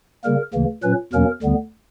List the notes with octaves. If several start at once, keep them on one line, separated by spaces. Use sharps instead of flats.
C#3 G3 A#3 A#4
D2 C#3 E3 A#3
A#2 F#3 C#4 B4
E2 B2 F#3 A#3 C#4 A#4
D2 D3 G3 B3